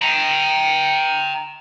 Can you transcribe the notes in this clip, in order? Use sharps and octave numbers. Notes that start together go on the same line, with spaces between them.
G5 A#5